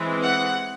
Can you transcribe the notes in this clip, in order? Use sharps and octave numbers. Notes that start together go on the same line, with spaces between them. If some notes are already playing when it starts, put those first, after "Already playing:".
Already playing: E3 G#3 C4
F#5